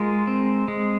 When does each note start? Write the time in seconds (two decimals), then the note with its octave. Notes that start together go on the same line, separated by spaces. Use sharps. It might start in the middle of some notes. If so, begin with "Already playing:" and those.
Already playing: G#3 F4 A#4
0.27 C4
0.68 G#3